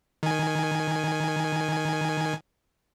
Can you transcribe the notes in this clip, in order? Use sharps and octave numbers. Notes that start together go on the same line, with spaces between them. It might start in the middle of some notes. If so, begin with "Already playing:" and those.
D#3 G#5